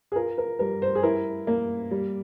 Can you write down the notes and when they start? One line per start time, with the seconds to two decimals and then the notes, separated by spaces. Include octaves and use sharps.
0.12 G#4
0.16 F4 A#4
0.38 A#4
0.59 G3 A#4
0.82 C5
0.95 G#4
1.03 E4 A#4
1.47 A#3
1.91 G3